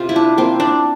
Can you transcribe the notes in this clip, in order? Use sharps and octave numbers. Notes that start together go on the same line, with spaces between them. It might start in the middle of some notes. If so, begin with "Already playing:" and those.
Already playing: C3 F4
E4
D4
A#3 C4
D4